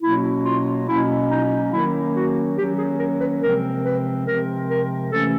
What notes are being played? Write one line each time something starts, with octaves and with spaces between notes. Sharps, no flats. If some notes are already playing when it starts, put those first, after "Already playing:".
B2 F#3 A#3 C#4 E4
F4
B2 F#3 A#3 C#4 E4
D#4
D#3 F#3 A#3 C#4 E4
F#4
D#3 F#3 A#3 C#4 G4
G#4
A#4
B4
C3 F3 G#3 C4 A#4
B4
C3 F3 G#3 C4 A#4
A#4
C3 E3 A3 C#4 A4